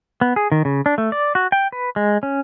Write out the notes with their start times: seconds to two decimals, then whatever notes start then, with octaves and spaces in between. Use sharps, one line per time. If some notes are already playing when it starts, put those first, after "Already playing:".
0.21 B3
0.36 G#4
0.52 D#3
0.65 C#3
0.86 D4
0.98 A3
1.12 D5
1.35 F#4
1.52 G5
1.72 B4
1.96 G#3
2.23 C#4